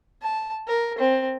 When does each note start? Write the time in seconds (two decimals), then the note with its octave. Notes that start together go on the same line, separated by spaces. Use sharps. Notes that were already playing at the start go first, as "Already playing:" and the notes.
0.22 A5
0.68 A#4
0.99 C4